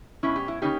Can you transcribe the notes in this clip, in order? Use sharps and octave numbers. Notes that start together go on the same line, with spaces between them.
B2 G#3 C#4 E4
G4
E4
C#3 A#3 C#4 D#4 G4